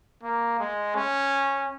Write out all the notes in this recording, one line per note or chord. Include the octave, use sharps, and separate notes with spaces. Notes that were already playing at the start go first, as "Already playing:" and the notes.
A#3
G#3
C#4